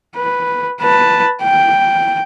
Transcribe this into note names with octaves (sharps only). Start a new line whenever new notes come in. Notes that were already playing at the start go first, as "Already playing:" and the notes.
B4
B4 A5
G5